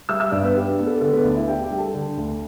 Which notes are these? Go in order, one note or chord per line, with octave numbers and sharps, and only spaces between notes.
G3 E5 E6
E5 E6
G2 D4 D5
B3 B4
D4 G4
B3
A4
D3 A4
B3 B4
D2 D4 D5
E4 E5
D4 G4 G5
G4 G5
G3
A4 A5
D3
D2